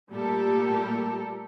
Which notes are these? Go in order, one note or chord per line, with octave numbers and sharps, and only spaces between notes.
A#2 G3 A3 G4 A4 A#4